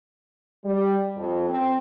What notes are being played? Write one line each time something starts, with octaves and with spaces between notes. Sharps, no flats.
G3
F2
C4